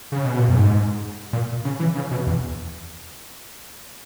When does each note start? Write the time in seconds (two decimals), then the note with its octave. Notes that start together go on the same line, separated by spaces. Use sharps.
0.12 C#3
0.25 B2
0.39 A#2
0.49 F#2
0.55 G#2
1.33 A#2
1.65 C#3
1.79 E3
1.95 C#3
2.11 B2
2.27 E2